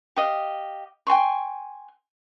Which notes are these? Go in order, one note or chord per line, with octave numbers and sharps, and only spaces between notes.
G4 D#5 F5
G5 G#5 C6 C#6